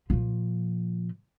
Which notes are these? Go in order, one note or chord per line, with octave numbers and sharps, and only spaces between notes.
A#2 F3